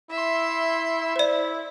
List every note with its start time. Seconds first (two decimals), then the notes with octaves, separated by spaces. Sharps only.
0.10 E4 E5 C6
1.16 E4 C5 D5